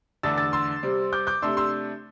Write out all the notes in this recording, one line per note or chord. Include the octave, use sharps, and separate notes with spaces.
E2 D3 A3 D4 E6 A6
E6 A6
C6 E6
C3 G3 C4
D6 G6
D6 G6
C3 A3 D4 C6 E6
C6 E6